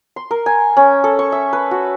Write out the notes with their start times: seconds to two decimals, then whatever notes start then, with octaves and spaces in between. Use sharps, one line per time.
0.16 C6
0.31 A#4
0.46 G#5
0.77 C#4
1.04 A4
1.19 C#6
1.32 E5
1.53 B4
1.71 F#4